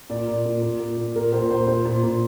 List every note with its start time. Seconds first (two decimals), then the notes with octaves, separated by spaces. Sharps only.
0.10 A#2 D5
0.27 A#2
0.45 A#2
0.62 A#2
0.79 A#2
0.97 A#2
1.16 A#2 A#4
1.32 A#2 C5
1.41 A#4
1.50 A#2 C5
1.67 A#2 C5
1.85 A#2
2.03 A#2